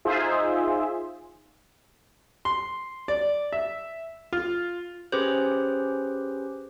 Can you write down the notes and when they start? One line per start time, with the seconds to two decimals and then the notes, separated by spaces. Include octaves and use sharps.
0.05 D#4 F4 G#4 C5 E5
2.45 C6
3.08 D5
3.52 E5
4.33 F4
5.12 C#4 G4 G#4 B4 C5